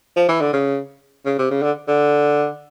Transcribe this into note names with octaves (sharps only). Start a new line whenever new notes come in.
F3
E3
D3
C#3
C#3
C3
C#3
D3
D3